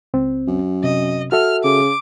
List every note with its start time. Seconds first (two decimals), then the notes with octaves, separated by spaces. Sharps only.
0.14 C#2 C4
0.48 F#2
0.84 C3 D#5
1.32 F#4 A4 E5 F6
1.64 C#3 D6